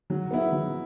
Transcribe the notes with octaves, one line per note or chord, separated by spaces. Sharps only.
F#3
B3 E4
F#3